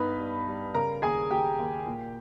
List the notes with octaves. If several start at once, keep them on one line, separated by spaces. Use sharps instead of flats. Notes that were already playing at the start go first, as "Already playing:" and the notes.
Already playing: G2 B3 D#4 B4 B5
G3
G3
C#3 A#4 A#5
D#2 G#4 G#5
D#2 G4 G5
D#2
A#2